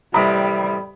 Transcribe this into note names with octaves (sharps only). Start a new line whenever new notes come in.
A1 C3 G3 A#5 B5 D#6